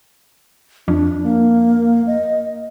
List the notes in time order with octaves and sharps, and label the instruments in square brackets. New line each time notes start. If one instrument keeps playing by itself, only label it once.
[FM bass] F2 [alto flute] D4
[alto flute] A#3
D#5